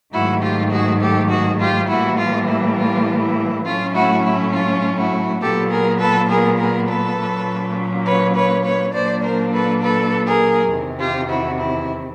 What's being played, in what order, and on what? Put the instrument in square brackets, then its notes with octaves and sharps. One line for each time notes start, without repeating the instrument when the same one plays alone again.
[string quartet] G#2 D#3 F#3 A3 E4 F#4
F4 G4
F#4 G#4
G4 A4
F#4 G#4
F4 G4
A2 E3 G3 A#3 E4 F#4
F4
E4
F4
E4
A2 F#3 A3 C#4 F4
E4 F#4
E4
F4
E4 F#4
A#2 F#3 B3 G4 A4
G#4 A#4
A4 B4
G#4 A#4
G#4 A#4
A4 B4
A#2 F#3 A#3 C#4
B4 C#5
B4 C#5
B4 C#5
A#2 F#3 A#3 D4 C5 D5
A#4 C5
A4 B4
A4 B4
G#4 A#4
E2 C3 D#3
F4 G4
E4 F#4
E4